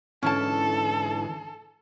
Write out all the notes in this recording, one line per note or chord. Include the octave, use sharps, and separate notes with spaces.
G#2 D3 E3 C#4 E4 A4 A5